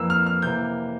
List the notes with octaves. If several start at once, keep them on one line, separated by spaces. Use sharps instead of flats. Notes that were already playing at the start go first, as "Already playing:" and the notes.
Already playing: F2 E3 A#3 E6
F6
F6
C3 E3 A#3 G6